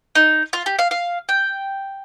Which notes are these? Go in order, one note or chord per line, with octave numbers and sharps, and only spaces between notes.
D#4
F4
G4
F5
F5
G5